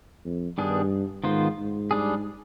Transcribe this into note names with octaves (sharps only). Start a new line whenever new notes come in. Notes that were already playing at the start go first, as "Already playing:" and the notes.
F2
G2 D#3 G3 B3 D4 G#4
G#2 D#3 B3 F4 C5
G#2
G3 D4 G#4